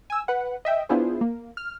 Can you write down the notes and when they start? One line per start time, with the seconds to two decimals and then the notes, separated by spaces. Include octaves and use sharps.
0.10 G#5 E6
0.28 B4 F#5
0.65 D#5 E5 G5
0.89 B3 D4 E4 F4 G#4 C5
1.21 A#3
1.57 F6